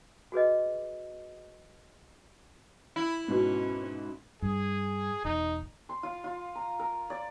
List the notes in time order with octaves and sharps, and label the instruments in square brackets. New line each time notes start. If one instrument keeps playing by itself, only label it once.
[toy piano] F#4 G#4 B4 D#5
[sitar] E4
[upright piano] G#2 B2 [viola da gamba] C#4
[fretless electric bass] G2 [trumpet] G#4
[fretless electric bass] E1 [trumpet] D#4
[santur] C6
F4
F4
A#5
A#4
D5